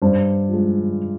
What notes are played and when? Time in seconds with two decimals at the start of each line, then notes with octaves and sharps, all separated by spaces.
0.02 G2 C5
0.49 F3 G#3